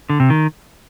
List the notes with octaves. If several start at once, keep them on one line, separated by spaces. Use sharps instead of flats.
D3
C3
D#3